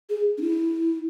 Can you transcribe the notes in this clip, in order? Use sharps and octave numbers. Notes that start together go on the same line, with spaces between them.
G#4
D4
E4